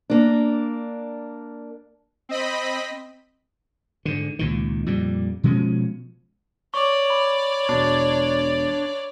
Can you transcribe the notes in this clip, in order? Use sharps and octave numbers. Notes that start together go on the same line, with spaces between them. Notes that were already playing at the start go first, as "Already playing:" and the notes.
A#3 D4
C4 D#5 B5
G#2 D3
C#2 A#2 D#3
F2 A#2 G3
B2 F3 G#3 C#4
C#5 D5 C#6 D6
B5
E1 B2 D4